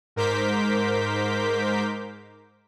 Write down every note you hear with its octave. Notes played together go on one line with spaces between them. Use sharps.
G#2 A#4 C5 D6 G6 B6